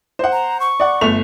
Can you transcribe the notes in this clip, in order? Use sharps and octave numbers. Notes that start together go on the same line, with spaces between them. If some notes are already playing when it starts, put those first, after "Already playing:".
C5 F#5
A#5
C#6
D5 F#5
G1 A3 F7